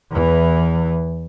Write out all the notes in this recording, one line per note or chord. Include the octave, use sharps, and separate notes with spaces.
E2 E3